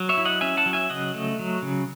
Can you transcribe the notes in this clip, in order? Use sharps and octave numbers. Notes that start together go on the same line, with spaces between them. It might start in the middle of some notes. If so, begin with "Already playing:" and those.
Already playing: F#3
C#5 E5
E4
D#5 F#5
C#4 E5 G#5
F#5 A5
F#3
E5 G#5
C#3 D#5 F#5
A3
F#3
C#3